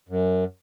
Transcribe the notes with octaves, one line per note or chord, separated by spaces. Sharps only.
F#2